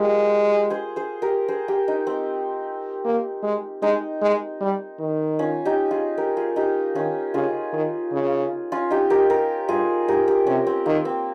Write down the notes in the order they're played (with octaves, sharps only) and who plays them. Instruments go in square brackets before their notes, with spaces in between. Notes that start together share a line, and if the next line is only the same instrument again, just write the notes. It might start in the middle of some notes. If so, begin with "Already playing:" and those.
Already playing: [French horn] G#3 [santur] F4 G4 A#4
[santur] G#4 C5
G#4 C5
G4 A#4
G#4 C5
G4 A#4
D#4
C4
[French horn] A#3
G#3
[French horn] G#3 [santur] D#4
[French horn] G#3
G3
D#3
[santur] C#4 F4
D#4 G4
F4 G#4
G4 A#4
F4 G#4
D#4 G4
[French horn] D#3 [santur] C#4 F4
[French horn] C#3 [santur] F4 G#4
[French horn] D#3
C#3
[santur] C#4 F4
D#4 G4
G4 A#4
G4 A#4
[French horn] G2 [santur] F4 G#4
[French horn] G#2 [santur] G4 A#4
[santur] G4 A#4
[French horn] C3 [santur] C#4
[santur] C4
[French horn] D#3 [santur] A#3
[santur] C4